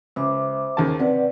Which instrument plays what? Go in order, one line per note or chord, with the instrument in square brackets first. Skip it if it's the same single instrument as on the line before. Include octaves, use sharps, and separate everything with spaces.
[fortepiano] C#2 [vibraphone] C5 E5 D6
[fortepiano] D#2 C#3 A5
[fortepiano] C3 [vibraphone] B4 D5 F#5